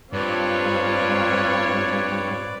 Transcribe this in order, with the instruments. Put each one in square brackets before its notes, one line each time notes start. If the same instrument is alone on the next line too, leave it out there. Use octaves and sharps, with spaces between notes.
[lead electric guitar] G2 [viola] C4 F4 [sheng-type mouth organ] B4 D5 [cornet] C#5